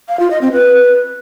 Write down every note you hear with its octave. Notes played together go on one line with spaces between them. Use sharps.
F5
F4
D#5
C4
B4